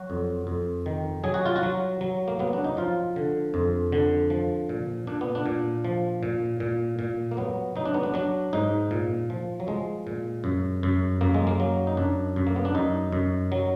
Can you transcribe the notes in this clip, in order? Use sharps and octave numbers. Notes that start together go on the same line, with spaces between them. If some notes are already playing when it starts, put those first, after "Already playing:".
Already playing: F#3 F#4
F2
F2
D#3
F#3 G#4
F#4
F4
F#4
F#3
F#3
A#3
F#3 B3
D4
D#4
F3 F4
D3
F2
D3
F3
A#2
A#2 D4
B3
D4
A#2
F3
A#2
A#2
A#2
A#3
F#3 B3
F#3 D#4
D4
B3
D4
F#3 D4
G#2 D#4
A#2
F3
F#3
F3 G#3
A#2
F#2
F#2
F#2 A#3
G#3
A#3
F#3
D#4
F#2 D4
F#2
A#3
B3
D4
F#2 D#4
F#2
F#3